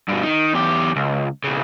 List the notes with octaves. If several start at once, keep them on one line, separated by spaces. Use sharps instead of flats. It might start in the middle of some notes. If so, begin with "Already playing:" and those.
G2 B2
D#3
E2 G4
C#2
B1 C#3